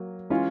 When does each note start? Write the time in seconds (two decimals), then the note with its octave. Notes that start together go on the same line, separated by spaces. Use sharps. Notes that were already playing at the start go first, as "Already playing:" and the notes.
Already playing: F#3 A#3
0.30 E3 G#3 C#4 F4